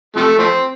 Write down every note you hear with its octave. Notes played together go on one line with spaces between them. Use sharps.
C3 F3 A3
F3 A3 C4